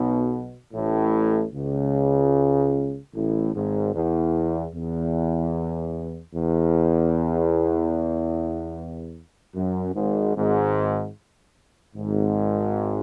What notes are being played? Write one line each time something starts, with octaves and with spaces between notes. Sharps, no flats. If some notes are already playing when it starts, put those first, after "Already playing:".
Already playing: B1 B2
A1 A2
C#2 C#3
A1 A2
G#1 G#2
E2
E2
E2
F#2
G#1 G#2
G#1 G#2
G#1 G#2